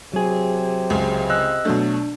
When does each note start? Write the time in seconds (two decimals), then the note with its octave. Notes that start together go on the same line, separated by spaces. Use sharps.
0.14 C3 F#3 G#4
0.90 C#2 C#3
1.30 D#5 E6 F#6
1.65 B2 F#3 A3 D4